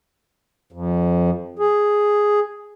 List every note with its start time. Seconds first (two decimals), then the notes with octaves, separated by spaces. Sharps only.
0.72 F2
1.59 G#4